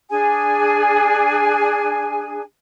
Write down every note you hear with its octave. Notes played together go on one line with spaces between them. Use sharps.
D4 G#4 G#5